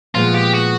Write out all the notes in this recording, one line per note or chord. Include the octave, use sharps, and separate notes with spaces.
A#2 F3 G#3 B3 F4
G4
F#4